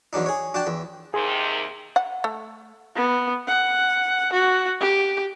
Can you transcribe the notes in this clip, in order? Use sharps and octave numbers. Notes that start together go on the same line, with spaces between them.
E2 F#3 D4 D#4
G#4 C#5
D4 F#4 G5 A5
E2
D#2 C3 D#3 G#4 C6
F#5
A3
B3
F#5
F#4
G4